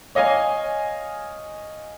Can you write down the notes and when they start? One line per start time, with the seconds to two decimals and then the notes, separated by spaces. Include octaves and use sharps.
0.15 C#5 D#5 F5 G#5